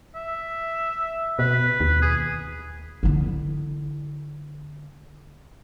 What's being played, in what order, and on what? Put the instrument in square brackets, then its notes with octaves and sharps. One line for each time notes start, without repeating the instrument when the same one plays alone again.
[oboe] E5
[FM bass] B2 [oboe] B4
[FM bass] D#2
[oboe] G#4
[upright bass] D3 E4